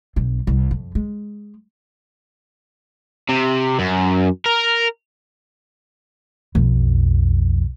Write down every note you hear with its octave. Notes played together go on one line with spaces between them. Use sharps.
B1 C4
C2
F2
G#3
C3
F#2
A#4
B1 F2